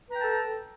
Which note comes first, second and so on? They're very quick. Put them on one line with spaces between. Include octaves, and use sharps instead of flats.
B4 A#5 G5 A5 A4